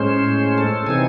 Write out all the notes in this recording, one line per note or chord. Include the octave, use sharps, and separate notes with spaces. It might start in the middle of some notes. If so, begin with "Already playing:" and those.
Already playing: A2 G#3 C#4 C5
A4
C3 E3 C4 D#4 G#5